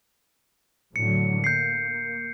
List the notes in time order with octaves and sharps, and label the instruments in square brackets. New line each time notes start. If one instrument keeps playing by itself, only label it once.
[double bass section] A2 D3 F#3 [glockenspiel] C#7
[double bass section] A#3 [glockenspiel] G6 C7